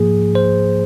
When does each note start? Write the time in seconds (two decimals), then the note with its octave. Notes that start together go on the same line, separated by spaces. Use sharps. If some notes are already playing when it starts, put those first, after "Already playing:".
Already playing: G#2 F3 A#3 G#4
0.35 C5